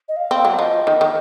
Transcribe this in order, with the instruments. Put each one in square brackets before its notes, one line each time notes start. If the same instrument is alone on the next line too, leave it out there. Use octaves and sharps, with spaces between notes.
[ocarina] D#5
F5
[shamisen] C4
F#3
[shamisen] F3 [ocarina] D#5
[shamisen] D#3
D#3